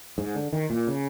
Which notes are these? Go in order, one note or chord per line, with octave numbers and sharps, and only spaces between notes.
G#2
D3
D#3
A#2
C#3